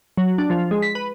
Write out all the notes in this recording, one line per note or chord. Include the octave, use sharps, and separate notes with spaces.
F#3
D4
F3
G#3
B6
B4